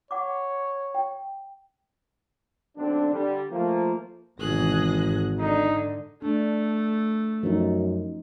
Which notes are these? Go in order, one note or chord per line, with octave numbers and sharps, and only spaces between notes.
C#5 F#5 D6
G5
B1 D3 C4 D4
D3 G3
F3 A3 A#3
G#1 B2 E3 G#4 F#6 A#6
G#2
D3 D#4
A3 D4
F#2 F3 D#4